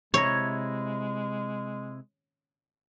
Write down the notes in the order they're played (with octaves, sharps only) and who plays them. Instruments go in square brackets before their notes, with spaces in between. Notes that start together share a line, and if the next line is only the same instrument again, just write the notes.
[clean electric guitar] C3 E4 A#5 [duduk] G#3 [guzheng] C#5